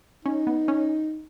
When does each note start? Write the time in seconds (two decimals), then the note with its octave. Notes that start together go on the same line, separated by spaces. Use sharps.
0.25 C#4 D#4
0.47 B3
0.68 C#4